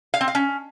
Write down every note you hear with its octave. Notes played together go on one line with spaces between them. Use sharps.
F5
C4
F5
C#4